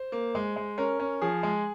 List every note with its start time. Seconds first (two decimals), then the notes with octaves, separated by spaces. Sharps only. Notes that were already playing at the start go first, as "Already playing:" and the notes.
Already playing: C5
0.12 A#3
0.35 G#3
0.56 G#3
0.78 C#4 A#4
1.00 C#4
1.22 F3 G#4
1.43 G#3